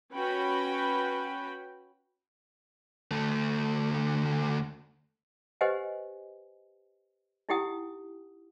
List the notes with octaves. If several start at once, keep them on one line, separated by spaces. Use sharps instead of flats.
C#4 F#4 B4 G5 B5
D2 A3
G4 B4 C5 D#5 F#5 G#5
D#4 E4 G4 F#5 G5 D#6